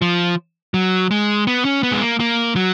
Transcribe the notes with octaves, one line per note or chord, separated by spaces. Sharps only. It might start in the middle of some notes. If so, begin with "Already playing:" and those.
F3
F#3
G#3
B3
C#4
B3
G#3
A#3
A#3
F#3